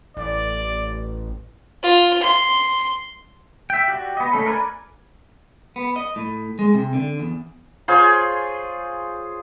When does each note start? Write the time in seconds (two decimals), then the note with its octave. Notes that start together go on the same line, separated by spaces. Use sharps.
0.17 A1 D5
1.83 F4
2.22 C6
3.70 E5 G5
3.88 F#4 G4 D5
4.17 B3 D#5
4.33 A3 C#4 A4
4.46 A#4 B4 D5 G#5
5.76 B3
5.96 D#5
6.16 A2
6.59 G#3
6.74 C3
6.94 D3
7.19 E2
7.88 F4 G#4 C5 C#5